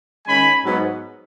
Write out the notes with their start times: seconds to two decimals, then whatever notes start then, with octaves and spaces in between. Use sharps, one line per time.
0.26 D#3 G#3 C#4 G#5 B5
0.65 G#2 F#3 B3